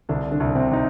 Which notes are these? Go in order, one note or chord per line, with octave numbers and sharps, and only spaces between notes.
C2 D3 D4
D3 D4
C2
C3 C4
C3 D#4